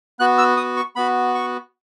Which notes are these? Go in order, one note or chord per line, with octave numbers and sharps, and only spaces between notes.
B3 F#4 F#6
E6
D#6
C#6
B3 F#4 B5
C#6